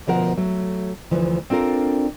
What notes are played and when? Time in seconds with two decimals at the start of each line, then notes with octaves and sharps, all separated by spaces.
0.07 D2 B2 F3 A#4 F#5
0.37 F#3 A3
1.11 D2 E3 F3
1.50 C4 D4 F4 A4 A#4